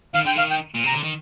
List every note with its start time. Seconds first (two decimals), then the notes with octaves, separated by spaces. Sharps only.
0.14 D#3 F5
0.24 D3 G5
0.35 D#3 F5
0.51 G5
0.74 A#2
0.84 C3 A#5
0.92 D3
1.03 D#3